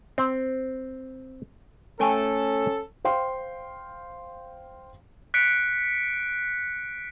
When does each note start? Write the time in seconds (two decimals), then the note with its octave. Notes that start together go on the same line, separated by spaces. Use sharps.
0.18 C4
2.00 A3 C#4 A4 G5 G#5
3.05 C5 F5 G5 C6
5.34 F#6 B6 C#7 D7